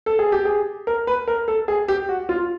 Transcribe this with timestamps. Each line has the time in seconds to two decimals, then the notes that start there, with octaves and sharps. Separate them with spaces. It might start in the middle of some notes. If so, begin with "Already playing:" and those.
0.06 A4
0.19 G#4
0.32 G4
0.45 G#4
0.87 A#4
1.07 B4
1.28 A#4
1.48 A4
1.68 G#4
1.88 G4
2.09 F#4
2.29 F4